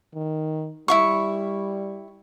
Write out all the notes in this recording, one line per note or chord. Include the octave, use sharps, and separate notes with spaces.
D#3
G3 E4 F4 C#6